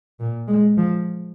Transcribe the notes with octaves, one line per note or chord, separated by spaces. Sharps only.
A#2
G#3
F3